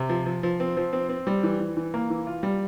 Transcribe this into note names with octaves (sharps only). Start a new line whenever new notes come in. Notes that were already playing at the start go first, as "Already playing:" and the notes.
Already playing: C3
F3
F3
F3
C4
F3
C4
C4
G3
E3
E3
E3
A#3
E3
F4
G3